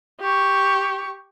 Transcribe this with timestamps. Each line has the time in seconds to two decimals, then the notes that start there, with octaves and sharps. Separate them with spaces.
0.20 G4 C#6